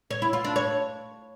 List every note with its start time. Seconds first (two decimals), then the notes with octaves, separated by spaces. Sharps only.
0.11 C#5
0.22 E4
0.33 F4
0.44 D4
0.56 C#5